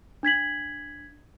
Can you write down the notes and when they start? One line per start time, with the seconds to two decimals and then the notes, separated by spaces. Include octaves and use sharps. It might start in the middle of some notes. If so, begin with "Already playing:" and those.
0.23 D4 G#6 B6 F#7